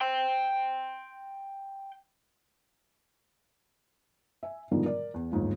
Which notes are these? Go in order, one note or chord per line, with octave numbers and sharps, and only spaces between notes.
G5 C6
E5 G#5
G#2 B2 D3 D#3 F3 G3
A#4 D5
E2
G1 D#2 G#2 F3